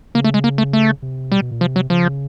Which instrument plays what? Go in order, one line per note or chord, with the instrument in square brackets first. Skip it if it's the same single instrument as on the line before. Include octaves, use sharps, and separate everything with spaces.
[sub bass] C#3 [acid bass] A#3
[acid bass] A3
G#3
A#3
A3
A3
[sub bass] C3
[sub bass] B2 [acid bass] G3
[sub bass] B2
A#2
[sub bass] C3 [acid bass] F3
[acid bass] F#3
[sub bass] C#3 [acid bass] F3